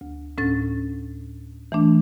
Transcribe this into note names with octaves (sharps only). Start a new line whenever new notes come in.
D2
D2 A2 C#4 A6
E3 A3 D4